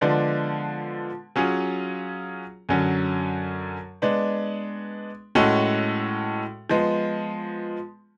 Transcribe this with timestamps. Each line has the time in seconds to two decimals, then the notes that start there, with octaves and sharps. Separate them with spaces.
0.01 D3 F3 G#3 B3 D4
1.36 F#3 C#4 F4 G#4
2.69 F#2 D3 F#3 C#4
4.02 G#3 B3 D4
5.35 A2 G#3 C#4 F#4 A4
6.70 F3 G#3 B3